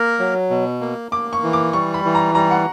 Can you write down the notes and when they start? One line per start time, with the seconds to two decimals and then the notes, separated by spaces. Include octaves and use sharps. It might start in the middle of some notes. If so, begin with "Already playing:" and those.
Already playing: A#3 A#4
0.19 F#3
0.50 B2
0.81 A#3
1.12 A#3 D6
1.33 C#6
1.43 E3
1.53 D6
1.73 G3 C#6
1.94 B5
2.05 E3
2.15 A#5
2.35 G3 A#5
2.51 F#5